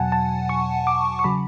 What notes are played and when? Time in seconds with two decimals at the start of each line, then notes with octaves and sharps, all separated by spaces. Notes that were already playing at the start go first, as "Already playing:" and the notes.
Already playing: E2 B2 F#3 F#5 G#5 A5
0.12 A5
0.49 C#6
0.87 D6
1.19 C#6
1.24 C#3 F#3 B5